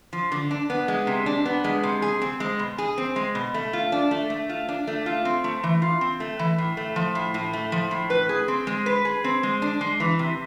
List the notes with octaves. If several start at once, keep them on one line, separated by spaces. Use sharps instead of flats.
F3
D3
D4
B3
G#3
C3
D4
B3
G#3
C3
G#4
C4
G#3
B2
G#4
C4
G#3
B2
A3
F4
D4
A3
A3
F4
D4
A3
F4
C4
A3
E3
F4
C4
A3
E3
A2
A3
F3
A2
A2
A3
F3
A2
B4
G#4
C4
G#3
B4
G#4
C4
G#3
D4
G#3
E3
C3